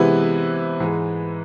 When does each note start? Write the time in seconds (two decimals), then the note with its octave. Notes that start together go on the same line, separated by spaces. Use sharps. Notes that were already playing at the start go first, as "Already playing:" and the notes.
Already playing: C3 E3 G#3 B3 E4 B4
0.80 G#2 E3 G#3